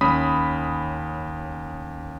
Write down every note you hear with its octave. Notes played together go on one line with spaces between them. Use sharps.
D#2 C#4 B5 D#6 B6